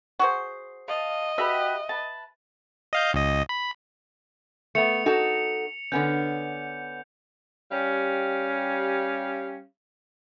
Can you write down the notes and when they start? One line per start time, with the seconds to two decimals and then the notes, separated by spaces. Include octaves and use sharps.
0.19 F#4 G#4 C5
0.88 D#5 F5 A5
1.38 F#4 G4 B4 E5
1.89 B4 A5
2.93 D#5 F5 G6
3.14 C#2 D#5
3.49 B5
4.75 A3 B3 C#7 F7
5.06 D#4 F#4 A4
5.92 D3 B3 C#4 G6
7.71 G3 C#4 G4 F5